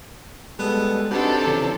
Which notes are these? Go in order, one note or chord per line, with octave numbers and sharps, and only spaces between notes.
G3 G#3 B3 A4
C3 D4 D#4 F#4 A4 B4 C5
C#3 E3 F3